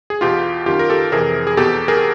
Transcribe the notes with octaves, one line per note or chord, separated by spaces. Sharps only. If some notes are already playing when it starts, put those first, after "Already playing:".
G#4
E2 B2 F4 G4
F#2 D#3 F4 G4
A#4
G4 A4
F2 C3 E3 G#4 A#4
G#4
E2 B2 G4 A4
G#4 A#4